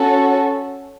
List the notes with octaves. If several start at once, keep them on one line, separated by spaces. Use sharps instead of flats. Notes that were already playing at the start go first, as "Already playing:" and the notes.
Already playing: C#4 F#4 A4